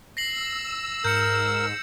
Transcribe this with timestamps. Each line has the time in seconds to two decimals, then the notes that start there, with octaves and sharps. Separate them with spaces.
0.17 E6 A#6 C7 F#7
1.04 G#2 A#4 G6 C#7